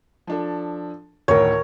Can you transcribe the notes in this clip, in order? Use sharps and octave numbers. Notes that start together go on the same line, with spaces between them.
F3 D4 A4
D2 A2 D#3 A#4 C#5